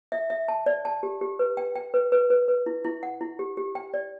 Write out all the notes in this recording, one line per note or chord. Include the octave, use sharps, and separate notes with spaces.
E5
E5
A5
D5
A5
G4
G4
B4
G5
G5
B4
B4
B4
B4
E4
E4
F#5
E4
G4
G4
G5
D5